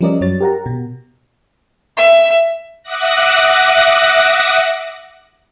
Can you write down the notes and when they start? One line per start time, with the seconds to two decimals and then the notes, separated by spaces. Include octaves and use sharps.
0.01 F3 G3 C#4 A#4 D5 D#5
0.21 F#2 F#3 C#5 A6
0.41 G4 A#4 F#5 A#5
0.66 B2
1.95 E5
2.83 E5 F#5 D6 D#6 F#6 A#6